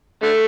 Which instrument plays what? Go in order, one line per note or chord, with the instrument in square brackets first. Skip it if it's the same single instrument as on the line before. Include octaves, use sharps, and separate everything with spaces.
[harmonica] D3 A3